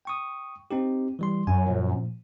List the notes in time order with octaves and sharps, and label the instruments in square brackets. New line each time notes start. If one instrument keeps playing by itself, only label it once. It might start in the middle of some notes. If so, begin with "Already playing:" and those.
[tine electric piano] G5 C#6 D#6
C4 D#4 G4
E3 G3 C6
[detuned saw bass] F#2 [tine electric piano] G#5
[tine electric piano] A#2 F3